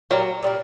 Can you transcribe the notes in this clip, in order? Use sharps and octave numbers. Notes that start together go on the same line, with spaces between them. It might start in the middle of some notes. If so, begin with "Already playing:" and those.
A#2 F#3 G3 A#3
A#2 G3 A#3